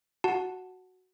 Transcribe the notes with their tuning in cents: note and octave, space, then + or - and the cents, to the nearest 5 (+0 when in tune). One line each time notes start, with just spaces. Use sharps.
F#4 +0 F#5 +0 A5 +0